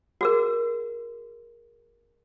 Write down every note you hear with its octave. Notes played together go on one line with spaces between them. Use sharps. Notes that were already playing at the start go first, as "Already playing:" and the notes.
F#4 G#4 A#4